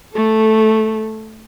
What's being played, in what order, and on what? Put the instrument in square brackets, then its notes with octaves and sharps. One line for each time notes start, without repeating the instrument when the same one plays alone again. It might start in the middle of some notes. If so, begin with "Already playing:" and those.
[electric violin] A3 A4